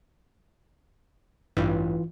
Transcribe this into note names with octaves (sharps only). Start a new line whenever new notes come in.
A1 G2 E3 F4